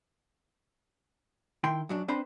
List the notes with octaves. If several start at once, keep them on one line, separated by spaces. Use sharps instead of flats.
D#3 E4 G5 C6
F#2 F#3 D4
C4 D4 B4 C5 A5 B5